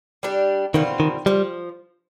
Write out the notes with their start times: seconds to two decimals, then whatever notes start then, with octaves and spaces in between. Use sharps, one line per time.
0.23 G3 D4 G4
0.74 B2 D#3 G3 C4 F4
1.00 D#3
1.26 F3 G3